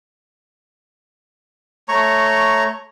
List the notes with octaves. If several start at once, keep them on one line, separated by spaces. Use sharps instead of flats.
A3 C#5 A#5 C#6